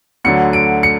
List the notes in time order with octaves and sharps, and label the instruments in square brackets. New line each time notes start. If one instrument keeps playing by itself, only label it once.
[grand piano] D2 D3 F#3 C#7
D7
C#7